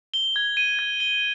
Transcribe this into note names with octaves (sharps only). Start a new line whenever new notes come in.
G7
G#6
D#7
G#6
G7